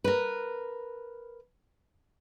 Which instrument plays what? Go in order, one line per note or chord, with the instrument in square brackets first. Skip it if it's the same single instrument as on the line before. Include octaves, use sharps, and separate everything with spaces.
[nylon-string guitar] A#4 B4